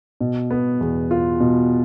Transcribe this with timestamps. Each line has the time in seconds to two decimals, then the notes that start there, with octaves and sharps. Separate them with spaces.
0.21 B2
0.51 B3
0.81 E2
1.11 F4
1.40 B2